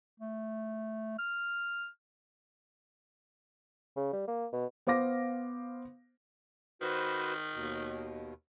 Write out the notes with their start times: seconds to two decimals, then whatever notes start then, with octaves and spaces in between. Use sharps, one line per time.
0.20 A3
1.19 F6
3.97 C#3
4.13 G3
4.28 A#3
4.53 B2
4.87 B3 C5 F5 D6 A#6
6.82 D#3 F#4 B4 C5
7.55 D#2 B2